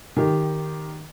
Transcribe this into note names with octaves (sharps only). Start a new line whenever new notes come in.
D#3 G4